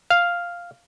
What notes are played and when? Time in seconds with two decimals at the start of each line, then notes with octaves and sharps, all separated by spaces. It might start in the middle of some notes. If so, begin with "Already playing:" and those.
0.10 F5